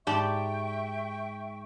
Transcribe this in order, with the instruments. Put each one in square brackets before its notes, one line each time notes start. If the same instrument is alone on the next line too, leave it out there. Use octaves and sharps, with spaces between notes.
[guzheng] G#2 [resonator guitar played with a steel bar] G4 D5 A5 [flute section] E5 G5 C#6